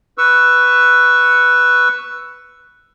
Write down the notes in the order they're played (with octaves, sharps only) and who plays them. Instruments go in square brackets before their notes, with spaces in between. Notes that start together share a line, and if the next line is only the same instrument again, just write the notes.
[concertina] B4 C#6 E6